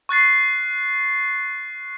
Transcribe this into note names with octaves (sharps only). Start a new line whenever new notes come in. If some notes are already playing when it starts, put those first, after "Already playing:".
C#6 F#6 A6 C7